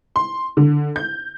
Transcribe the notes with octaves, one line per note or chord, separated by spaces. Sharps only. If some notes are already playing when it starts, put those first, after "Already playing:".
C6
D3
G6